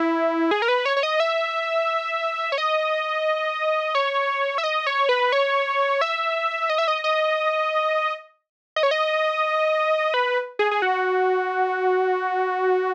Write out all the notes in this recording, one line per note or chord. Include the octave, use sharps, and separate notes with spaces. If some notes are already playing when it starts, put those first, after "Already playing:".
Already playing: E4
G#4
A#4
B4
C#5
C#5
D#5
E5
C#5
D#5
C#5
E5
D#5
C#5
B4
C#5
E5
D#5
E5
D#5
D#5
D#5
C#5
D#5
B4
G#4
G#4
F#4